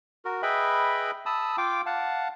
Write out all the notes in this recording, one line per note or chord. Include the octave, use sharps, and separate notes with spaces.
F#4 A#4
G#4 B4 D#5 E5 G5 B5
A5 B5 D#6 E6
F4 F5 G5 D6
F5 F#5 A5